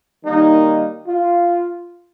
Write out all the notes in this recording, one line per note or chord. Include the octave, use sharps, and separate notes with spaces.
D#3 G3 A#3 D#4
F4